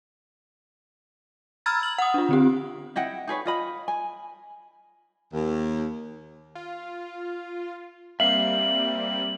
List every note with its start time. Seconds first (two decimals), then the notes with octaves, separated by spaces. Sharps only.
1.66 A#5 B5 E6 F6 G#6 A6
1.83 F#7
1.98 F#5 D#6
2.14 D4 F4
2.29 D3 C4 G4
2.96 E4 D#5 F#5 G5
3.27 D#4 G#4 B4 C#5
3.45 F4 D#5 B5
3.88 G#5
5.32 D#2
6.55 F4
8.20 G3 A#3 C4 E5 F5 F#7